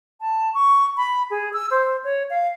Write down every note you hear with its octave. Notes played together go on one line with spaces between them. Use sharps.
A5
C#6
B5
G#4
E6
C5
C#5
F5